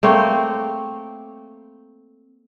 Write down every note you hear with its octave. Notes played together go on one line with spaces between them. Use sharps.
A3 A#3 C4 C#5